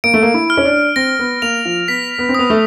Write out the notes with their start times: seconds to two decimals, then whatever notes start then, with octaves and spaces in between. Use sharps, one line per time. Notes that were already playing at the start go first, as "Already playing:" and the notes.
0.04 A#3 D7
0.14 A3
0.23 A#3
0.34 E4
0.50 F6
0.57 C#4
0.65 D4
0.96 C4 A#6
1.19 B3
1.42 A#3 F7
1.65 F3
1.88 B3 B6
2.19 B3
2.29 C4
2.34 B3 D#6
2.50 A3